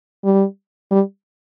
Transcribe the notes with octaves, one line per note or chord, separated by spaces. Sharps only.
G3
G3